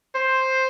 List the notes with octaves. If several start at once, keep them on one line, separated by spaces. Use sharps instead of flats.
C5